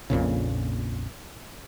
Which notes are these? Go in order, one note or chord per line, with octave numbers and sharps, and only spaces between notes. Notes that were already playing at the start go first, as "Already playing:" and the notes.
A#1 F2 A#2 C#3